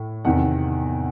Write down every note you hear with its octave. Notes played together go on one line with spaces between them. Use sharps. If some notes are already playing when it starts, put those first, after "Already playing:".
Already playing: A2
E2 C3 D#3 F#5